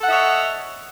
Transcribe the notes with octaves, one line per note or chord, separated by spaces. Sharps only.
A4 C#5 D#5 E5 F#5